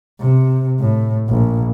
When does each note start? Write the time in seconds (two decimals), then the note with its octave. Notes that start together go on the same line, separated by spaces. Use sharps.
0.20 C3
0.80 A2
1.29 A#1